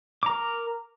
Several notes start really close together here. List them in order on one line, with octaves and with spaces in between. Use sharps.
D6 A#5 A#4